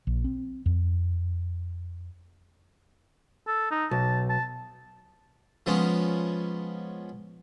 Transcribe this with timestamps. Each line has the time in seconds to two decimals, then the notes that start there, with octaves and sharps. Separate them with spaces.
0.07 A#1
0.25 C4
0.66 F2
3.48 A4
3.72 D#4
3.91 B1 A5
4.30 A5
5.66 F3 G#3 B3 C#4